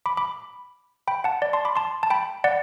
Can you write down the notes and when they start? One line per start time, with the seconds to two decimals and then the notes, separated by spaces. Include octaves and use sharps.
0.06 B5 D6
0.17 B5 D6
1.07 G5 B5
1.24 F#5 A5
1.42 D5
1.53 A5 C6
1.65 B5 D6
1.76 A5 C6
2.03 A5
2.10 G5 B5
2.44 D5 F#5